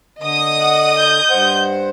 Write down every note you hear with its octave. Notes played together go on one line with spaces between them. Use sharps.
D3 D#5 D#6
F#5
G6
G2 C5 F#5